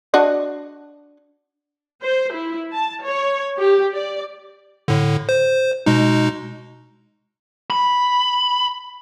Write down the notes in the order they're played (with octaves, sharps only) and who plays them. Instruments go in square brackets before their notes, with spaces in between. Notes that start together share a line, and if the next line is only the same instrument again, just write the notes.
[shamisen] D4 F#4 D#5
[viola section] C5
E4
A5
C#5
G4
D5
[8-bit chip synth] A2 D3
C5
B2 G#3 D#4
[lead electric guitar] B5